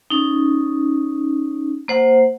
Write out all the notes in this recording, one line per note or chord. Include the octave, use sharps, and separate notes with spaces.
C#4 D#4
A#3 C5 F#5